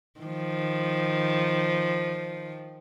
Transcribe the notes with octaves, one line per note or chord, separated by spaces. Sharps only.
D#3 F3